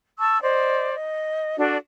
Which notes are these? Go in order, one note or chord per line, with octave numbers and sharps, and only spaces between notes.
A5 C#6 E6
C5 D5 D#5
D#5
D4 F#4 A4 D5